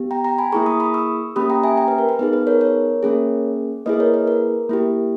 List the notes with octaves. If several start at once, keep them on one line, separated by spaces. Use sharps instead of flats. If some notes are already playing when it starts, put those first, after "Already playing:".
Already playing: B3 G4
G5 A#5
G5 A#5
G#5 B5
A#3 E4 G#4 A#5 C#6
B5 D#6
B5 D#6
C#6 E6
A#3 C#4 G4 B5 D#6
G5 A#5
E5 G#5
G5 A#5
B4
A#4
B4
B3 D#4 G#4 B4
B4
A#4 C#5
A#4 C#5
A#3 C#4 G#4
A#3 E4 G#4 B4 D#5
A#4 C#5
B4
A#4
A#3 E4 G4